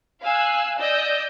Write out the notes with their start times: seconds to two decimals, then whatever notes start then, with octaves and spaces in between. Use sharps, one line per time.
0.23 F5 G#5 E6 F#6
0.79 D5 D#5 E6 G6